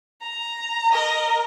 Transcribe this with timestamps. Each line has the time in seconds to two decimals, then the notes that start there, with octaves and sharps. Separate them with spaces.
0.21 A#5
0.93 A#4 D#5